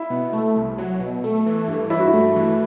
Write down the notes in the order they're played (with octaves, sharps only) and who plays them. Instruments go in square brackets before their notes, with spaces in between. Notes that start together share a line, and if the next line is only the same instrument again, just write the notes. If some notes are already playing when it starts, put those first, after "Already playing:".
Already playing: [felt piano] E4
[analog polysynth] B2
A3
C2
F#3
B2
A3
E3
G2
[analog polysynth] G2 [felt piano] E4
[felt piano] F#4
E4
[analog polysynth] A3
E3